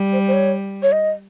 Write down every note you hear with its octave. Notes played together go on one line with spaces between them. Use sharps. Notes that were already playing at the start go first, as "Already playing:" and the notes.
Already playing: G3
C5
C5
C#5
C#5
D#5